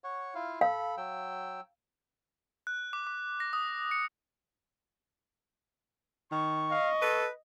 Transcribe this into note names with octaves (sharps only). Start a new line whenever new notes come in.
C#5 F#5 C#6
E4 F4 F5
A4 F5 B5
F#3 G5 E6
F#6
D6
D6
A#6
D#6
C#7
D#3 C#6
D#5 F5
A4 B4